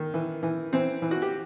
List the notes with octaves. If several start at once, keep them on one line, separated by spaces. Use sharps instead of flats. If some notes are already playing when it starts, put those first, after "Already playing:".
Already playing: D#3
E3
E3
E3 C4
E3
F#4
G4